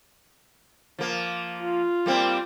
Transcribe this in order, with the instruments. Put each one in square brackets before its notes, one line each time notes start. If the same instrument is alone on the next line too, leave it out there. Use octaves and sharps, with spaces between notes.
[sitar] F3 A#3
[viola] F4
[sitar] G3 A#3 C4